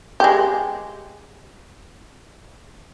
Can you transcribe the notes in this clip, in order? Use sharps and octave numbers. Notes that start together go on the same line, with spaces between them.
G#3 G4